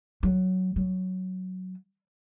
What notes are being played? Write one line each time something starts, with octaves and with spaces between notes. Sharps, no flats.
F#3
F#3